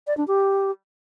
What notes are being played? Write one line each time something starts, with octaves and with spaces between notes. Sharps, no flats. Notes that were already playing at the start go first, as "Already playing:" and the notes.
D5
D4
G4